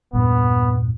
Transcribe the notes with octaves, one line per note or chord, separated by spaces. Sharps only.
E2 G2 A#2 B3